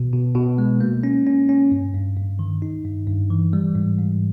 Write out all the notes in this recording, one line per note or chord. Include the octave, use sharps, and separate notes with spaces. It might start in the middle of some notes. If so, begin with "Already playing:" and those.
Already playing: B2
B2
B2
G#3
A#3
C#4
C#4
C#4
G2
G2
G2
D#3
D#4
G2
G2
E3
G3
G#2
G#2